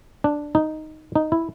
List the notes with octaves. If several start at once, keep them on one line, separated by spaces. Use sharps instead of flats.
D4
D#4
D#4
E4